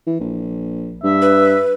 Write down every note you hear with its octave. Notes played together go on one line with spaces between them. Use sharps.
E3
A#1
G2 E5
B4